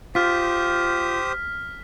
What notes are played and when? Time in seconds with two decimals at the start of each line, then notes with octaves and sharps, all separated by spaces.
0.15 F4 G4 C5 D#6 F6 B6